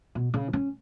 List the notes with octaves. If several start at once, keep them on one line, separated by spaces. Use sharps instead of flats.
B2
C#3
C#4